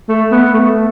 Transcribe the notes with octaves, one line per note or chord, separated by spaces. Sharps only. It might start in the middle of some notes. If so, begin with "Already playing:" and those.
A3
B3
A3